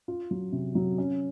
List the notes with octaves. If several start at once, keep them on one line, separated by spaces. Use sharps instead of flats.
F4
F#3
C3
F#3
C#4